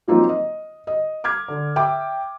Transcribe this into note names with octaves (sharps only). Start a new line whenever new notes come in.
F3 F#3 A#3 C4 D#4 F4
D#5
D#5
D6 F6 G#6
D3
E5 G5 D6